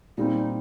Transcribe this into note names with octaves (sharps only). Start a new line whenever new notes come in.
A#2 G3 C4 D#4